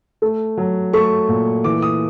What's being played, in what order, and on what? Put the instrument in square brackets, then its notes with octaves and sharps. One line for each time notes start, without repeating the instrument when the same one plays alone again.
[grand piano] A3
F#3
A3 C#6
A#2
E3 D6
D#6